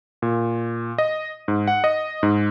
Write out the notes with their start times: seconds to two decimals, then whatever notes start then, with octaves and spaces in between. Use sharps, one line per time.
0.22 A#2
0.98 D#5
1.48 G#2
1.68 F#5
1.84 D#5
2.23 G#2